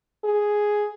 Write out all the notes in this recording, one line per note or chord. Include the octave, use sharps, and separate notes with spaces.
G#4